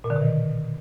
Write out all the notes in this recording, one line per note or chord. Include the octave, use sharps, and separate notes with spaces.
A#2
D3
B2
D#3